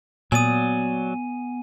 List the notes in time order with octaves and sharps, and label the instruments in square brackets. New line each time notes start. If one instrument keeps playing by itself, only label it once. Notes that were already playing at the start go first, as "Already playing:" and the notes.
[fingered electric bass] A#2 [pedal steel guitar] F#3 D5 D#6 [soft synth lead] B3 [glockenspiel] G#5 D#7